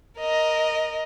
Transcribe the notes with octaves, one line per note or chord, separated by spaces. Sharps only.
A#4 D#5